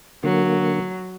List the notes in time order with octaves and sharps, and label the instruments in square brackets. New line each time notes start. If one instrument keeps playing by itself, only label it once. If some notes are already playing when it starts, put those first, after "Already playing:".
[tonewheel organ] D3 A#3 [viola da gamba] F#3